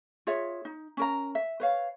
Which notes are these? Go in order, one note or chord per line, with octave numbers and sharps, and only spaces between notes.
F4 G#4 C#5 E5
D#4
C#4 A#4 A#5
E5
B4 C#5 F5